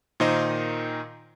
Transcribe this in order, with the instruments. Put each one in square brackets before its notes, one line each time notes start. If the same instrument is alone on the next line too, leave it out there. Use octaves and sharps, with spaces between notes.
[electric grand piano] A#2 D#3 D#4 C5 D#5